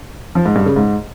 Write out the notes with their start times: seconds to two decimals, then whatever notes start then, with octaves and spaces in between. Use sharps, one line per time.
0.35 F3
0.46 G#2
0.56 G2
0.66 C#3
0.76 G#2